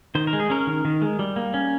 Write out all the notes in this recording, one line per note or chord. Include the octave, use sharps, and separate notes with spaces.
D#3 C5
A#4
G#3
G#4
C#4 A#4
D#3
D#3
G#3
G3
A#3
C#4